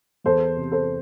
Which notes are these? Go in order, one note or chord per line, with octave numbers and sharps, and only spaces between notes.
E2 A4 C5
C3
A4 C5